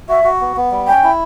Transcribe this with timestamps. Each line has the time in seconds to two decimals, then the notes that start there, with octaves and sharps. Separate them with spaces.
0.08 F#4 E5
0.24 F#4
0.41 B3
0.57 B3
0.71 G3
0.87 C#4 G5
1.03 E4